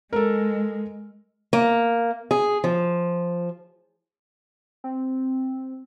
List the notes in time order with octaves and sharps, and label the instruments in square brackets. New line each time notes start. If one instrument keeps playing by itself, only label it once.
[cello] G#3 [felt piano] A4 A#4
[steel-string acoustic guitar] A#3
G#4
F3
[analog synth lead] C4